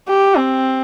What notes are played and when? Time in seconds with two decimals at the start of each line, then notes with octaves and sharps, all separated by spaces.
0.08 G4
0.36 C4